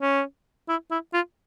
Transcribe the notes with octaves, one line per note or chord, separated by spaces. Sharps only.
C#4
E4
E4
F4